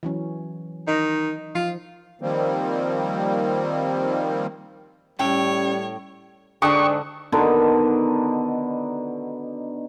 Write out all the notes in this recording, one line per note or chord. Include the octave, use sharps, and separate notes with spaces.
E3 F#3 C#4
D#3 D#5
F3 F4
D#3 F3 G3 A#3 C4
A2 G3 C#4 C#5 G5
G#2 D3 D4 G5 A5 C#6 D#6 F#6
B2 D3 D#3 D4